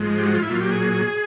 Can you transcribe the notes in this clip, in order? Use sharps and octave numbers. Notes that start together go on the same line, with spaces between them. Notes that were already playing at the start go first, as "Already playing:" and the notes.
Already playing: G#2 F3 G#3
G4
F#4
F4
E4
A#2 F#3 F4
G4
G#4